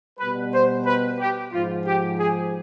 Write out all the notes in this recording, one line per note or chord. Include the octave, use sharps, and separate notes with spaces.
B2 G3 B4
C5
B4
G4
G#2 F3 F4
G4
G#4